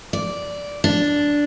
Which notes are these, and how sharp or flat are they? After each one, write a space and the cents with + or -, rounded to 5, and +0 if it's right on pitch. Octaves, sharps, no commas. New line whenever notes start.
D5 -10
D4 -5